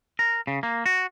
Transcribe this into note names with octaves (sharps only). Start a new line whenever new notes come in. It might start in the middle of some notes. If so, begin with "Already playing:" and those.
A#4
C#3
A#3
F#4